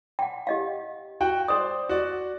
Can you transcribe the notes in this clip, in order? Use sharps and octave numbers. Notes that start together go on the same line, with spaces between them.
F#5 G5
G4 D#5 F5
F#4 F#5 G5
C5 D5 D#6
F#4 D5